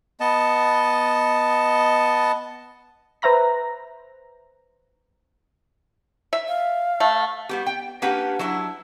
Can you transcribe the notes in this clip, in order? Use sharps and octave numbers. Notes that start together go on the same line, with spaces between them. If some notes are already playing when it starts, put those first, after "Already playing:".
B3 D#5 A5
B4 C5 E5 A#5 A#6
E5
F5
A3
G3 B3 G4
G5
A#3 C#4 D4 G4 B4 F#5
F#3 D4 E4